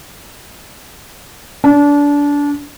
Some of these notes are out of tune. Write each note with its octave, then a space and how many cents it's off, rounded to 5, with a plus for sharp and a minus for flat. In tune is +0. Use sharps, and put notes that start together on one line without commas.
D4 -25